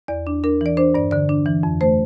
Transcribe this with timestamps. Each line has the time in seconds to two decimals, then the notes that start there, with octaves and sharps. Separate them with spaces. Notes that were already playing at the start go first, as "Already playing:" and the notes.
0.08 E2 D5
0.27 D4
0.44 D4 A#4
0.61 E3 D5
0.77 D4 C5
0.94 G2 D5
1.11 D3 D5
1.29 D4
1.46 E3
1.63 F2
1.81 A3 C5